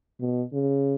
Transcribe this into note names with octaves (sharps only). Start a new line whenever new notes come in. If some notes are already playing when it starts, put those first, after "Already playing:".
B2
C#3